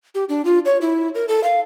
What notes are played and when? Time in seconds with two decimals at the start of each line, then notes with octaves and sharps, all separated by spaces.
0.15 G4
0.29 D4
0.45 F4
0.65 C#5
0.81 E4
1.15 A#4
1.28 A4
1.44 F5